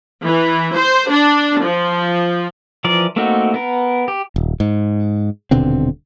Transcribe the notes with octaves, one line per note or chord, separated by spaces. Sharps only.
E3
C5
D4
F3
E3 F3 A#4 D5
A3 A#3 C4 D#4 F#4
B3 A#4
G4
D#1
G#2
D#1 B2 D3 C4